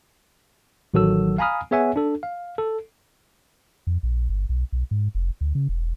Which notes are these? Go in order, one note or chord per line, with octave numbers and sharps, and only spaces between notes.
A1 D#3 F#3 F#4 A4 E6
F5 G#5 A#5 B5 D#6 F6
B3 G#4 C#5 E5 F#5 G#5
D4 A4
F5
A4
F2
A#1
G1
B1
B1
G#2
F1
D2
C#3
E1